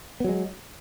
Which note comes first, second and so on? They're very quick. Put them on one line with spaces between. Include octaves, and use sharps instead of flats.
B3 F#3 G#3